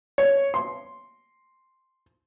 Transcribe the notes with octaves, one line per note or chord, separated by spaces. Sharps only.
C#5
C6